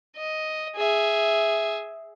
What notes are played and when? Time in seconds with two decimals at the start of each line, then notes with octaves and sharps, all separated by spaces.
0.17 D#5
0.76 G#4 E5